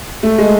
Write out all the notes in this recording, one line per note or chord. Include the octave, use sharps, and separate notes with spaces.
A3
G#3